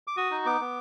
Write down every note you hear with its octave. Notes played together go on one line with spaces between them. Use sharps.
D6
F#4 D#6
D#4
B3 D6
B3